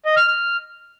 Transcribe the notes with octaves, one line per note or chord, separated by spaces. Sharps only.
D#5
F6
F6